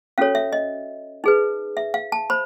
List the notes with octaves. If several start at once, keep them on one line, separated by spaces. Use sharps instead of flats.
C#4 F#4 A4 C#5 F5
E5
D#5
D#4 G#4 B4
E5
F5
A5
C5 B5